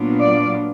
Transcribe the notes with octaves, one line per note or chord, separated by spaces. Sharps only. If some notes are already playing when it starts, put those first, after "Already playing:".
Already playing: A#2 F#3 B3 D4 F4
D5